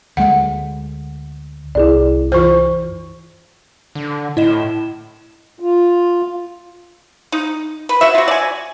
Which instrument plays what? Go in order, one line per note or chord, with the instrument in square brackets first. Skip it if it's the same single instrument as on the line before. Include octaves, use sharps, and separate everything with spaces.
[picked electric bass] D2 G#3 [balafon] F#5
[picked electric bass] C2 [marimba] E4 G#4 D5
[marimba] F#2 E3 C#6 [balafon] F4 C5
[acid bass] D3
[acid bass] A2 [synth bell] E4 D#5 E7
[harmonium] F4
[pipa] D#4
B4
F#4 E5
F4 F#4
D5 G#5